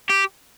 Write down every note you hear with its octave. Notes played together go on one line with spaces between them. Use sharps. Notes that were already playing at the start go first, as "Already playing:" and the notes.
G4